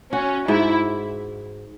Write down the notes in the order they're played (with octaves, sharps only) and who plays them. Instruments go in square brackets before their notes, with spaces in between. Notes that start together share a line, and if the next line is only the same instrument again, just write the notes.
[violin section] C#4 [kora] F#4
[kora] G#2 [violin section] E4